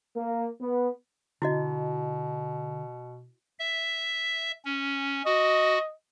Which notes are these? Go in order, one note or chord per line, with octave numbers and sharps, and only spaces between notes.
A#3
B3
B2 D3 E4 F#4 D#5
E5
C#4
F#4 D#5